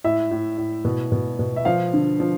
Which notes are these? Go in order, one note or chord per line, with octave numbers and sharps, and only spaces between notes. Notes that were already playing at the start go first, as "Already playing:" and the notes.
A2 E5
A2
A2
B2
B2
B2
E5
F3 F5
D3
F3